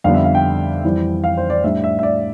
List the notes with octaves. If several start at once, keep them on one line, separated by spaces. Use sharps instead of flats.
F2 D3 G3 B3 F5
E5
F5
G5
F2 E3 G3 C4 E4
F5
C5
D5
A2 G3 D4 E5
E5
E5
D5